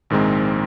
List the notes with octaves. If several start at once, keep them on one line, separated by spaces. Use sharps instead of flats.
A#1 G#2 D#3 G#3 C4